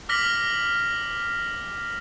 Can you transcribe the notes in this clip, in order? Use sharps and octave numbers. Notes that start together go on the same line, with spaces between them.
D6 F6 A#6 B6 F#7